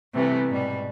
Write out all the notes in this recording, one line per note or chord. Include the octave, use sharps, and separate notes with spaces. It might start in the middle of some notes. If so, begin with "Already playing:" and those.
C3 E3 G3 A3 B3
G#2 B2 G3